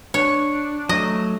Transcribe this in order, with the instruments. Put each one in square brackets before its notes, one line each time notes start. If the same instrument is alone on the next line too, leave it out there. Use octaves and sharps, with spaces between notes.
[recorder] D4 [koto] C#5
[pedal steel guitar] F#3 A3 [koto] D#5